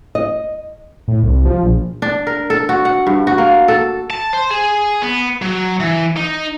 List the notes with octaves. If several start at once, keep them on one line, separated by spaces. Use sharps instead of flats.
D#5
A2
C2
F3
A#1
D4
A#4
A4
F#4
F#5
G2
F#4
A#3
A4
A5
C5
G#4
B3
F#3
E3
D#4